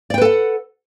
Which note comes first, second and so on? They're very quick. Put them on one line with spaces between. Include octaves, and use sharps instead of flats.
D5 G5 B4 A4 F#5